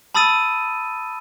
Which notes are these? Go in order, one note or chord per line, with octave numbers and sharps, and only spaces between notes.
A5 B5 D#6 E6 A6 D#7